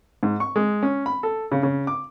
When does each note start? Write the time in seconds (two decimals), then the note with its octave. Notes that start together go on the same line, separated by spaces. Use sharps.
0.23 G#2
0.40 C#6
0.56 G#3
0.83 C#4
1.06 B5
1.23 A4
1.52 C#3
1.63 C#3
1.87 D6